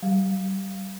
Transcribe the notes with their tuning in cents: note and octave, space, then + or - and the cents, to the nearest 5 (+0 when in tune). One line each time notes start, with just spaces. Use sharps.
G3 -35